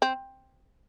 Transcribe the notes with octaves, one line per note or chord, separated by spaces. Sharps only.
C4